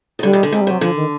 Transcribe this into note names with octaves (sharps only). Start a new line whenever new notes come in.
D#3
D3 G3
D#3
D3
C3 G#3
G3
C3 F#3
D3 F3
D#3